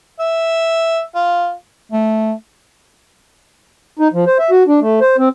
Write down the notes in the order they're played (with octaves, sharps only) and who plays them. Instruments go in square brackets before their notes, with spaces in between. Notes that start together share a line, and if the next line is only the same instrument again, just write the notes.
[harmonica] E5
F4
[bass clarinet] A3
[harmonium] D#4
F3
C5
E5
F#4
D4
A3
C5
C4